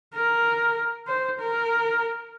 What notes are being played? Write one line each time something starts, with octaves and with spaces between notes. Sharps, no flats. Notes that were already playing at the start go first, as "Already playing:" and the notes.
A#4
C5
A#4